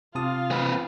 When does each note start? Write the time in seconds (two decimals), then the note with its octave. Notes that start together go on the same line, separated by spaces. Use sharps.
0.15 C3 F4 F5 A5 D#6
0.51 C4 B4